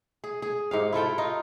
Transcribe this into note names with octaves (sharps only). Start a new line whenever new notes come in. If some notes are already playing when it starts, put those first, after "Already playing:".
G#4
G#4
G#2 G4 F5
E4 F4 A4 G5
D#4 F4